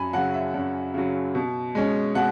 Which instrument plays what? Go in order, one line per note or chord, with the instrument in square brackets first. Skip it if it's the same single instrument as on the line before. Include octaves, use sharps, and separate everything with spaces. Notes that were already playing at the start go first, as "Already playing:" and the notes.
Already playing: [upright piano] F#2 G#5 B5
C#3 F#3 F#5
E5
F#2
C#3 F#3
B2
G#3 C#4
B2 F#5